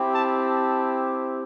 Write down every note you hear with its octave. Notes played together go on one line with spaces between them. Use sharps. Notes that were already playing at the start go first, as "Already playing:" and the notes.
Already playing: C4 E4 G4
A5
A5